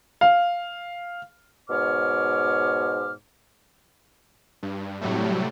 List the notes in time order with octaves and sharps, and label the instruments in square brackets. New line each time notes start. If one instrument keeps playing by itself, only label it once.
[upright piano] F5
[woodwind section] G#2 B2 C#5 D6 F6
[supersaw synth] G2
A2 C3 F#3 G3 A3